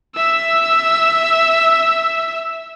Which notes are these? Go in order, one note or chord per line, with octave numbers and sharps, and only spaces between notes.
E5 E6